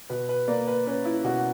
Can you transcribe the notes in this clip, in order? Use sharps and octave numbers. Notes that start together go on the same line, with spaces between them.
B2 B4
B4
A#3 D5
B4
C#4 B4
E4
B2 F#4